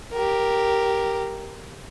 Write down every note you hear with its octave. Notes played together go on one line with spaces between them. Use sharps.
G4 A#4